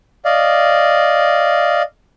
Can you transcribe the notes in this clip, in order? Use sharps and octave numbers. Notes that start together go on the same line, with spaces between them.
D5 D#5 F5